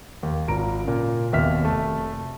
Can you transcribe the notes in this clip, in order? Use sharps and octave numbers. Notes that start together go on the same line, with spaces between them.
D#2
G#1 F4 A#5 D7
A#2 C#3
F1 D#2 B2 E5 F6 B6
F1 A3